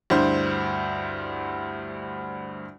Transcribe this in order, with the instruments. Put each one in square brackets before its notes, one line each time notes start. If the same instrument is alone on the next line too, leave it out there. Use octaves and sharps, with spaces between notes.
[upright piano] D2 G2 E4 C5